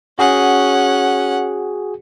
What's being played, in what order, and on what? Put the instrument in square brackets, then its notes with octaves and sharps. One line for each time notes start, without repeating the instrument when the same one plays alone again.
[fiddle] C#4 F#5 [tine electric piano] F#4 G#4